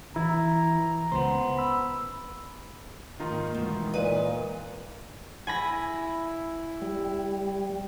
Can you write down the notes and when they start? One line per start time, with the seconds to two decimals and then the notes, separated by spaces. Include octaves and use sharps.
0.16 E3 E4 A#5
1.12 C#2 B3 C5
1.58 B5 E6
3.20 G#1 D#3 A#3 D#4 F4
3.54 D2 B2 E3 G#3
3.94 A#2 B4 D#5 G#5 D#7
5.47 E4 G#5 B5 A#6
6.82 G3